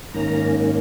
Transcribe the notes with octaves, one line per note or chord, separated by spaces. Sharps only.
G#2 D#3 A#3 C#4 A#5